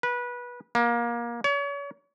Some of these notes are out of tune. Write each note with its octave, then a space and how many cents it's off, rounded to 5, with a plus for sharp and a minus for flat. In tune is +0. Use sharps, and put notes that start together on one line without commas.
B4 -20
A#3 +25
C#5 +35